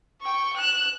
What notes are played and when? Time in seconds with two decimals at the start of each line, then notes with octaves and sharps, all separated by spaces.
0.21 G5 C#6
0.56 F#6 E7